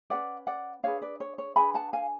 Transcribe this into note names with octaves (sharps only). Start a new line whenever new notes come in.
C#4 G#4 B4 D5 F#5
D5 F#5
D4 G#4 B4 C#5 F5
B4 D5
C#5
C#5
D4 G#4 B4 G#5 B5
F#5 A5
F5 G#5